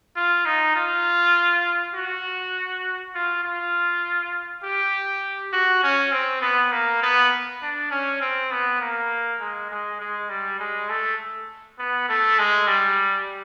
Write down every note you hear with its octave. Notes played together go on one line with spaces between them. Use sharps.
F4
D#4
F4
F#4
F4
F4
G4
F#4
C#4
C4
B3
A#3
B3
D4
C#4
C4
B3
A#3
G#3
G#3
G#3
G3
G#3
A3
B3
A3
G#3
G3